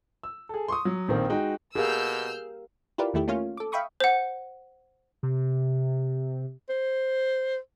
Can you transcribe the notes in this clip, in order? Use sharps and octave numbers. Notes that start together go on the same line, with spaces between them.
E6
G#4 A4
C6 C#6 D#6
F#3
A#1 D#3 C4 A#4
G#3 D#4 F#4 G5
B2 G4 G#4 A#4 F5 E6 F6 G6
E4 F4 G4 A#4 B4 D5
E2 D#3 A3 E4 G4
A3 A#3 C#4 F4 C#5 F5
A4 D6
E5 F5 G5 B5 C#6 D#6
C5 F#5
C3
C5